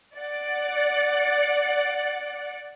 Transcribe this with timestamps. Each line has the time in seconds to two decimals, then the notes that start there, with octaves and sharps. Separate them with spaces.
0.17 D5 F#5